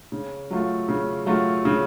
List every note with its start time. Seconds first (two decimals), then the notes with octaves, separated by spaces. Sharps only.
0.12 C#3
0.51 F#3 A3 F4
0.89 C#3
1.26 F#3 A3 F4
1.65 C#3